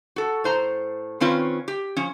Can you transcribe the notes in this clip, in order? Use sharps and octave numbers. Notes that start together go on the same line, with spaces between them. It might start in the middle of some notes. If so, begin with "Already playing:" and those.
F#4 A4
A2 C5 A#5
D#3 C4 C#4 F4 B4
G4
F3 C#4